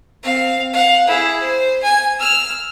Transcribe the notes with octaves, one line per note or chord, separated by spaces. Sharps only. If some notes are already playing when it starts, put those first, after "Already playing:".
C4 F5
F5 F#5
E4 G#4
C5
G#5
E6 F6